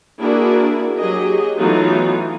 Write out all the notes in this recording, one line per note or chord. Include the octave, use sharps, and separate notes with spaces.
A#3 D4 E4 F#4 G#4 A#4
F#3 G4 G#4 D#5
E3 F#3 A3 B3 D#4 F4